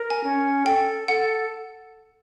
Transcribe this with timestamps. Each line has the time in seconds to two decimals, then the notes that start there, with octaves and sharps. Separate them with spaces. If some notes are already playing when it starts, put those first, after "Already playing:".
Already playing: A#4
0.10 G#5
0.24 C#4
0.66 A4 G5
1.08 A4 F#5